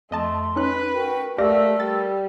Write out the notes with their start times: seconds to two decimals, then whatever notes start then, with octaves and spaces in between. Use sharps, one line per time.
0.11 F2 A3 D#5 A5 C6
0.56 C#4 D#4 B4 F#6
0.92 F#4 A#4 G5
1.38 A3 G4 A#4 D5 F5 E6 A#6
1.80 G3 A6